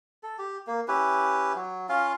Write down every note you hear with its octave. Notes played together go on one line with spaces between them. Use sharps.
A4
G4
A#3
C#4 E4 G4 B4
F#3
C#4 F4 F5